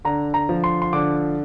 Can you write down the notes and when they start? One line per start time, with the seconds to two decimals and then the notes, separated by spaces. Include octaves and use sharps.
0.05 D3 A#5
0.34 A#5
0.49 F3
0.64 C6
0.82 C6
0.93 D3 D6